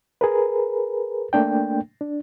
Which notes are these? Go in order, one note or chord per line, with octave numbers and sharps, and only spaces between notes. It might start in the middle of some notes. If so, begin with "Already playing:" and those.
G#4 A#4 B4
A3 A#3 D4 G5
D4